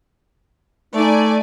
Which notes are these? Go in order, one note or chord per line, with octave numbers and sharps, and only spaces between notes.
A3 D#4 D5 G#5